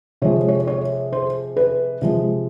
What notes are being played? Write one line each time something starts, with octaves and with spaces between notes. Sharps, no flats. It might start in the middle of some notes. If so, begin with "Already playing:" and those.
C3 F3 G#3 C#5
C#5
C#5
C5
B4
C3 F3 G#3